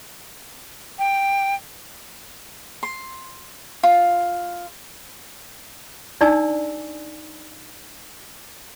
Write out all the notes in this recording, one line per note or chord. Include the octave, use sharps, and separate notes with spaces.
G5
C6
F4
D4 D#4 D5 G#5 A5 E6